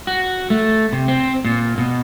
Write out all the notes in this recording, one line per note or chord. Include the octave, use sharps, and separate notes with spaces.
F#4
A3
C3
C4
A#2
B2